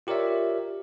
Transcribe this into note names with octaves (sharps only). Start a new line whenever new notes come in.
F4 G4 A#4 C#5 D5 E5